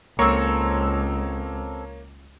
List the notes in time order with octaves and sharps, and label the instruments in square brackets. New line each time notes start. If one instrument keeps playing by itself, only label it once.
[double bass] C#2 [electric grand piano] A#3 C#5 A#5 [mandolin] C4 A4 C#6